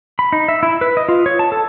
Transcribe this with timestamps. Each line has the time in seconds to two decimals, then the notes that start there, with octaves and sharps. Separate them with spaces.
0.19 B5
0.33 D#4
0.48 E5
0.63 E4
0.81 B4
0.97 D#5
1.09 F4
1.26 C#5
1.39 A5
1.52 A4